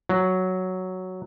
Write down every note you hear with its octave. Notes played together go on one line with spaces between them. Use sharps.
F#3